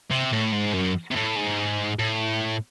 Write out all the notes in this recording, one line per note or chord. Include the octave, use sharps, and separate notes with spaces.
C3
A2
G#2
F#2
C3
A2
G#2
A2